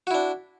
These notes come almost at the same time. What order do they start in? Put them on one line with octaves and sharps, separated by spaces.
F#4 E4 D4